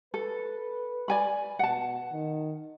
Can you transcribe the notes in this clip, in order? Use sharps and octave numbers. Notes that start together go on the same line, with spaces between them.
A4 B4
D5 G#5 B5
B2 F#5 A5
D#3